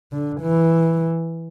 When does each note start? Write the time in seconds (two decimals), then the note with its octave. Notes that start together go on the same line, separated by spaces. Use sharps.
0.12 D3
0.41 E3